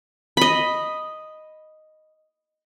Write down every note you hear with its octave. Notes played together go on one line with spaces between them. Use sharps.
D#5 B5